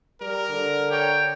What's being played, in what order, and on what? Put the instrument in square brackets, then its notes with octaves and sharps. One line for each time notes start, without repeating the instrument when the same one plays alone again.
[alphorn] G3 [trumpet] A#4
[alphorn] D3
[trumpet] C#5 [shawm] G5